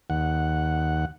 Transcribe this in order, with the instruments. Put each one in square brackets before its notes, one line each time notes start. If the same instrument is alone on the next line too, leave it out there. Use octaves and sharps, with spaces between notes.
[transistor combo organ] D#2 F#5